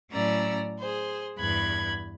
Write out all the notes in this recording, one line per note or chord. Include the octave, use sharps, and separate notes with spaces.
A2 F#3 C#4 D5 A#5 E6
G#4 C5
E2 G2 B5 F#6 G#6